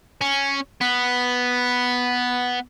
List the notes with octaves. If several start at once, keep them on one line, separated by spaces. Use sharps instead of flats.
C#4
B3